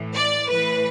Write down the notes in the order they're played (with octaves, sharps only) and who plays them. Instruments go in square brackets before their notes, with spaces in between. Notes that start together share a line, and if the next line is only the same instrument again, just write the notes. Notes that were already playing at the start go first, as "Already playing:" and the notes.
Already playing: [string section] A2 E3
D5
A2 E3 B4